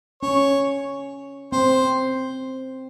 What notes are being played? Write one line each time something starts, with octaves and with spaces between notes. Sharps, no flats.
C#4 C#5
C4 C5